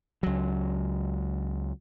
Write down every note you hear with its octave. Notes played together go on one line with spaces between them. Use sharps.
C#2 F#3